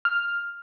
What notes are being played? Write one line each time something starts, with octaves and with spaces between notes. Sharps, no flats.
F6